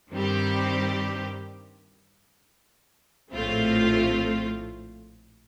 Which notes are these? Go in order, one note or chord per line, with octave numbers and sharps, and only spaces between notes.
G2 D#3 G3 C4 G4
A#1 A2 A3 C4 F4